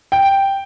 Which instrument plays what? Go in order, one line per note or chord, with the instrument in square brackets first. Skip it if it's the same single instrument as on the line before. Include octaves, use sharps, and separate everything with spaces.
[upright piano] G5